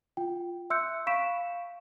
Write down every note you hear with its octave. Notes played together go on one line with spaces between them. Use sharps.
F4 G5
E5 C6 E6 F#6 G6 C#7
F5 B5 C#6 B6 D7 E7